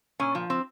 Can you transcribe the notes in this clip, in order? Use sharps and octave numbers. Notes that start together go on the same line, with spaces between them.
A#2 C#4
F3
C4